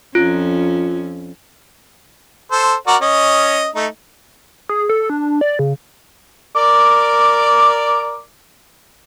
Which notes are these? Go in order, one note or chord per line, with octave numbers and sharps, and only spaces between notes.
F2 C#4 F4
A4 C5
F#4 A#4 D5
C#4 D#5
A3 D#4
G#4
A4
D4
D5
C#3
A#4 D5 D6